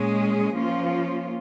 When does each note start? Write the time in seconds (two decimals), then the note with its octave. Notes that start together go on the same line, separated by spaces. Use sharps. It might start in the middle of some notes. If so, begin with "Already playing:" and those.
Already playing: A#2 G#3 C#4 G#4
0.54 F3 A#3 C#4 F4